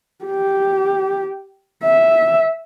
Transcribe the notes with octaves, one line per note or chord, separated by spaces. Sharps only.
G4
E5